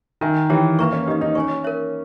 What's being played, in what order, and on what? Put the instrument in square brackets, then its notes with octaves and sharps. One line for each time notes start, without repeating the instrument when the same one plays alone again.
[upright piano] D#3 [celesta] A#4 E5 G#5
[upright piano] E3 [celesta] G4 C#5 G5 A#5
[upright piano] A#3 [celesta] B4 E5 A#5 C#6
[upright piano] C#4
[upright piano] D#4 [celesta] G4 B4 D#5
[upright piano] D#4
[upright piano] C#4 [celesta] C#5 G#5 C#6
[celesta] A#4 C#5 E5